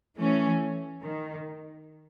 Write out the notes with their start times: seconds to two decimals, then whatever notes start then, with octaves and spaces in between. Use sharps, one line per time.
0.18 E3 A3 C#4
1.04 D#3